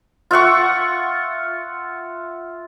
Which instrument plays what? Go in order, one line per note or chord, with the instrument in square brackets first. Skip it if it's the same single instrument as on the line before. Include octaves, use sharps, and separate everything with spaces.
[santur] F4 E5 F#5 C#6